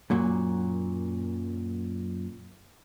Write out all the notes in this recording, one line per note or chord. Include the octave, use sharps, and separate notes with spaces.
F#2 A#2 F#3